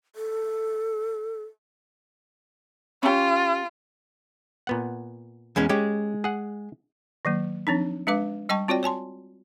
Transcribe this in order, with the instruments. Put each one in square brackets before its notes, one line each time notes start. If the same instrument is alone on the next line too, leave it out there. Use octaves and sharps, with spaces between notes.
[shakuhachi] A4
[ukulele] C#4 G4 [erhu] F4
[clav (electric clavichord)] A#2 B3 F#5
[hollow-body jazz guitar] E2 G#3 C#4
[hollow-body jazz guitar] G#3 [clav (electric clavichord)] C#4 G4
[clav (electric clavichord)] G#4 F#5
[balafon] D#3 F#3 A#3
F3 C4 D4 D#4
G#3 D4 B4 F5 D6
G3 D#5 G5 A5 C#6
C4 F4 F#4 C#5 D5 G5
C#5 G#5 A5 C6